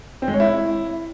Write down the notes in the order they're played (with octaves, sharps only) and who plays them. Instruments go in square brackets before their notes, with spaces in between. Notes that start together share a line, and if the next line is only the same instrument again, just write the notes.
[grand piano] C4
G#3
C#5
E4